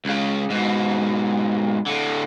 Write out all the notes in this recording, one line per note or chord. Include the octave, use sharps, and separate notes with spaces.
C#2 C#3
G#2 B2
A2 D3